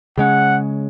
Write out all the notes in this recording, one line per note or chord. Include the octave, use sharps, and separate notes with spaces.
C#3 G#3 C#4 F#5